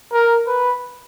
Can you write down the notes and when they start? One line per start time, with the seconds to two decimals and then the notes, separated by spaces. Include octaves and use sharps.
0.13 A#4
0.47 B4